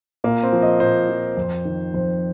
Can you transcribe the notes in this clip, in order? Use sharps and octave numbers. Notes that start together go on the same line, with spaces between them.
A#2 A#3
C4
F3
D#5
A#2 C5
F3
F2
D#3
F2 C5